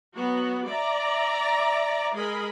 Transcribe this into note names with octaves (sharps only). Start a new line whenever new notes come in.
F#3 B3 F#4
D5 E5 A#5
G#3 G#4 A#4 D#5 B5